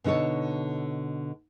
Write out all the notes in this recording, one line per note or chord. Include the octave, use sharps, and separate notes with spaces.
B2 D3 D#4 A4 C#5